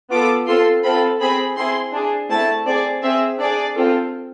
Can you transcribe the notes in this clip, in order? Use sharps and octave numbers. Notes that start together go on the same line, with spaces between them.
B3 F4 A4 D6
C4 F4 A4 C6
C4 F4 A4 B5
C4 G#4 B5
C4 E4 G#4 C6
D4 G#4
A3 C4 E4 A5
C4 G#4 D5
C4 G#4 E5
D4 G#4 D5
C4 F4 A4